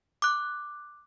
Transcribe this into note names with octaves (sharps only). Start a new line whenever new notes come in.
D6 F#6